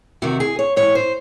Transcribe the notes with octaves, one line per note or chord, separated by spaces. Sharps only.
E2 C3 D#3 F#4
G#4
C#5
G#2 E3 C#5
C5